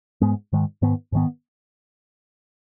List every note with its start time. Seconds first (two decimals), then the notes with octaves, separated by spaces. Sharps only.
0.21 G#2 G#3 B3
0.53 G#2 D#3 G#3
0.82 G#2 D#3 B3
1.12 G#2 D#3 B3